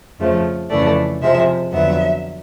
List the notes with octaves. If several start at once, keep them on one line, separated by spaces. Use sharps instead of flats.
F2 C#3 F3 A3
F2 C#3 E3 A3 D5
C3 F3 G#3 E5
F2 D3 F#3 B3 E5